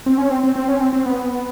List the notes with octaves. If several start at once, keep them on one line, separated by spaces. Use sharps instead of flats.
C4
C#4
C4
C4
C4
C#4
C4
C4
B3